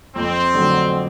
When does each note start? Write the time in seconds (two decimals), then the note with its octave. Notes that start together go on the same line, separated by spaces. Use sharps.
0.16 F2 C4
0.54 D3 F#3 A3